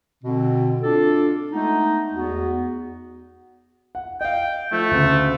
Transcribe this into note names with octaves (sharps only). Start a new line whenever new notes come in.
B2 D3 C4
D4 F4 A4
G#3 A3 B3 D#4
E2 B3 F#4
F#5
D#5 F5 G5
F3 A3
D2 C#3